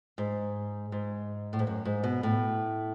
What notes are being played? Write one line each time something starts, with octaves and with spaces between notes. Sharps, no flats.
G#2
G#2
A2
G#2
F#2
G#2
B2
A2